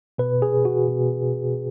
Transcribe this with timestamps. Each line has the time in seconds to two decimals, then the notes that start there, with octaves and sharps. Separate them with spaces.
0.18 B2 B4
0.42 G#4
0.65 F#4
0.88 B2